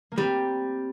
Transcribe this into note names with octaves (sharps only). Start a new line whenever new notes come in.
A#3
G3 C4